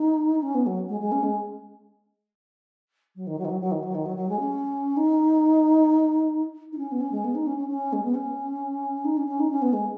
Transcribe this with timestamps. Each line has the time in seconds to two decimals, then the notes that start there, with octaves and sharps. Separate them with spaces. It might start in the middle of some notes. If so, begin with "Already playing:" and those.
Already playing: D#4
0.43 C#4
0.55 B3
0.66 F#3
0.89 G#3
1.00 G#3
1.12 C#4
1.23 G#3
3.16 F#3
3.27 D#3
3.39 F#3
3.45 D#3
3.49 F#3
3.61 F#3
3.72 D#3
3.83 F#3
3.95 D#3
4.06 F#3
4.17 F#3
4.29 G#3
4.40 C#4
4.97 D#4
6.73 D#4
6.78 C#4
6.92 B3
7.00 C#4
7.12 G#3
7.24 B3
7.35 D#4
7.47 C#4
7.58 C#4
7.69 C#4
7.93 G#3
8.04 B3
8.14 C#4
9.05 D#4
9.17 C#4
9.28 C#4
9.40 D#4
9.51 C#4
9.62 B3
9.73 G#3